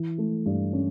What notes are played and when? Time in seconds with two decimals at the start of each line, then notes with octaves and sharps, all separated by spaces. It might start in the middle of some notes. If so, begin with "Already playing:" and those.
Already playing: E3
0.18 A3
0.46 G2
0.73 C#4